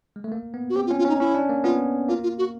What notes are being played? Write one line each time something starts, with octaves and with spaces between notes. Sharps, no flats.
G#3
A3
A#3
B3
F#4
C4 G4
F4
C#4
F4
C#4 D#4
C#4 E4
D4
A#3
B3 F4
A#3 F4
F4
F#4